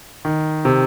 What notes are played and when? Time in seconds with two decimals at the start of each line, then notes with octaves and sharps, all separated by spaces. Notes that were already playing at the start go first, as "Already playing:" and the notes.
0.25 D#3
0.65 C3